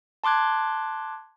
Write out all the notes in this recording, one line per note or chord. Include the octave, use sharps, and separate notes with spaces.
A5 C6 D6 F#6 G#6